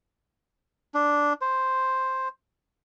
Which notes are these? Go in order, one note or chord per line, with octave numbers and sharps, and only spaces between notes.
D4
C5